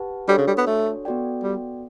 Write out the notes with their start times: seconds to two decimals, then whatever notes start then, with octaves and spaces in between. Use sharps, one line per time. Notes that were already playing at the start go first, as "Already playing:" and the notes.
Already playing: G4 B4 F#5 A5
0.28 G3 D4 F#4 A4 C#5
0.38 C#3
0.47 G3
0.57 B3
0.67 A3
1.05 B3 F#4 A4 D5 G5
1.43 G3